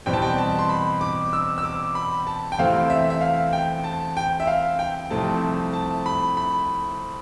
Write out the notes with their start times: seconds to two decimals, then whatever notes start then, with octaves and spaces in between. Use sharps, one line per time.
0.06 E2 B2 G3 C4 G5
0.13 A5
0.22 G5
0.38 A5
0.59 C6
0.69 B5
1.01 D6
1.33 E6
1.58 E6
1.64 D6
1.95 B5
2.27 A5
2.52 G5
2.58 E2 C3 E3 A3 C4 F5
2.90 E5
3.10 E5
3.21 F5
3.53 G5
3.84 A5
4.17 G5
4.40 E5
4.47 F5
4.79 G5
5.10 C2 C3 F3 A3 C4 A5
5.73 A5
6.06 B5
6.37 B5